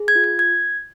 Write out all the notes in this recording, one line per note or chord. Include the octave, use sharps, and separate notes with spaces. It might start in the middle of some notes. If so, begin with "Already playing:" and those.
Already playing: G#4
G#6
F4
G#6
G#6